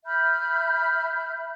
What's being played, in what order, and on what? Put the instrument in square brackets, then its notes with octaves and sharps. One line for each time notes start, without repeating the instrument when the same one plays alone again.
[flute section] E5 B5 F6 G6